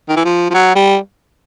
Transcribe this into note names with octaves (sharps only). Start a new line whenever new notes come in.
D#3
E3
F3
F3
F#3
G3